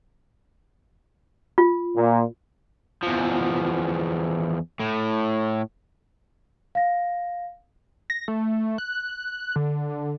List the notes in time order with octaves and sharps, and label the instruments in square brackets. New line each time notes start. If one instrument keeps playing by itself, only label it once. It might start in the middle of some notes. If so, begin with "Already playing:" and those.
[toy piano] F4
[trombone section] A#2
[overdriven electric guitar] E2 F3
A2
[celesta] F5 A#6
[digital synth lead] A#6
A3
F#6
D3